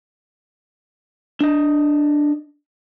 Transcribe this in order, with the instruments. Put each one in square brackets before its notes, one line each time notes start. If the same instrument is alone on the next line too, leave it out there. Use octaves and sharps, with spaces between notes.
[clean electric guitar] D4 D#5